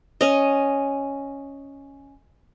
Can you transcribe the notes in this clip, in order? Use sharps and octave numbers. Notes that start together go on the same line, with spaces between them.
C#4 D#5